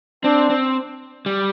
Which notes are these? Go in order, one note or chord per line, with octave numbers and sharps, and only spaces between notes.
C4 D4
C4
G3